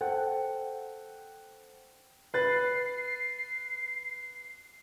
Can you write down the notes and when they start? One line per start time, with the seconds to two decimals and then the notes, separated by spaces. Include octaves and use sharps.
0.01 A4 C5 F#5 G5
2.34 B4 F#6 A6 C7